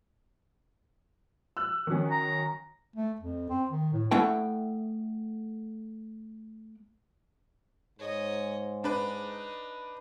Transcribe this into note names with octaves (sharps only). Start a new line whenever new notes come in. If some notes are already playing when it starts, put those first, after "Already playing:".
E6 F#6
D#3 F#3 C#4
A#5
A3
F2
C4
D#3
A2
A3 E4 F#5 G5
G#2 C#5 D#5
D4 D#4 B4